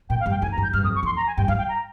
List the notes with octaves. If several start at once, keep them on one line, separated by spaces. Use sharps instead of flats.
A#2 G5
F5
G2
G5
F2 G#5
A#5
G2
G6
G2 F6
F2 D#6
C#6
F2 C6
A#5
G#5
G2 G5
G2 F5
G5
A#5